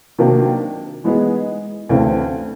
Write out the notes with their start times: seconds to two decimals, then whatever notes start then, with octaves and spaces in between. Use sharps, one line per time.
0.18 C3 D#3 F#3 A#3 D4
1.04 E3 G#3 B3 D#4 G#4
1.89 D2 C#3 E3 A3 C4